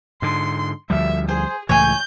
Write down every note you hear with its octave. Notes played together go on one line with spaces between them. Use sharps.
G#2 D3 C6
D2 F3 G3 E5
G#4 C5
C#2 A2 E3 C#5 G#5 G6